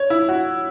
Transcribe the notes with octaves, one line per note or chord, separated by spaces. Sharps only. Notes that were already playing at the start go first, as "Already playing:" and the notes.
Already playing: C#5
E4
F#4